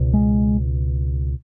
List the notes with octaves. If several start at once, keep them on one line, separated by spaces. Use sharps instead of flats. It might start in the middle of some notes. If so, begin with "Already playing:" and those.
Already playing: C#2 B2
G#3